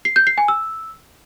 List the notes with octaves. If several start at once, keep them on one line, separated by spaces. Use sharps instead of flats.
C7
G6
C7
G#5
E6